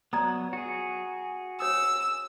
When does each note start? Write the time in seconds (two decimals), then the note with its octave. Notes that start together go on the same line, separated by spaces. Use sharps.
0.13 F#3 B3 D5 A#5 D#6
0.53 F#4 G#4
1.60 C#5 D#6 E6